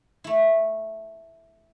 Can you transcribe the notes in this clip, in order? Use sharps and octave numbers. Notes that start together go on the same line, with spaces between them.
A3 E4